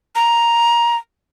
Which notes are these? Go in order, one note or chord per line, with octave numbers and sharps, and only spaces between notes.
A#5